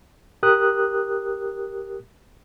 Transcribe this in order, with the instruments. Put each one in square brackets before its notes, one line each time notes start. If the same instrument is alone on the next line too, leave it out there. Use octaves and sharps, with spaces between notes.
[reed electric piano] G4 A#4 D#6 F#6